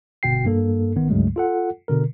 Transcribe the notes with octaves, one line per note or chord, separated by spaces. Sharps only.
G1 B2 F#4 G5 C7
G2 A#3 A4
A1 D#3 B3
C#2 G2 C#3 F#3 G#3 A3
F4 A4 F#5
B2 D3 A#4